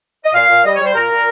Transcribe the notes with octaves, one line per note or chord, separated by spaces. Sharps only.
D#5
A#2 F5
A#2
G3 D#5
C#5
G3 C5
A#2 A#4
A#2